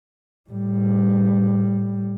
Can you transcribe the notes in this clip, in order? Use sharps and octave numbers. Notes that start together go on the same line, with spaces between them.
A2 G3